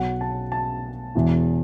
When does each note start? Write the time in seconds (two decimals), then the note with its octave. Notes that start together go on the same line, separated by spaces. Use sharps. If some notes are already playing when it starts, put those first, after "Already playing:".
Already playing: B1 B2 F#3 F#5
0.21 A5
0.52 A5
1.15 E1 E2 E3